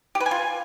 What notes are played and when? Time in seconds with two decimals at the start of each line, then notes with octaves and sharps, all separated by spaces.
0.15 G4
0.20 B4
0.26 G#5
0.31 F4